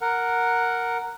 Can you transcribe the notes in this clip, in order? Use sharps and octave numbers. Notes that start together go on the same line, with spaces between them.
A#4 F#5